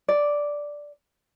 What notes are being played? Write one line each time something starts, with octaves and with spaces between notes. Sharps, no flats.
D5